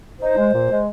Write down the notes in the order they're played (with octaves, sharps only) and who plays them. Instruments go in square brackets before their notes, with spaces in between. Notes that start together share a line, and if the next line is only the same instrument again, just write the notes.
[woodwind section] D#4 [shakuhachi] C5
[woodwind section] G#3
A#2
G#3